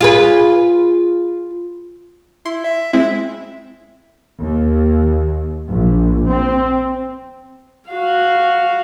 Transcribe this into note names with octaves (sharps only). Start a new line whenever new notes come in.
F4 G#4 B4
E4 C6
E5
G#3 C4 E4 E5
D#2
A#1
C4
F#4 F5